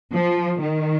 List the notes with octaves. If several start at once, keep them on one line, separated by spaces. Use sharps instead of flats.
F3
D#3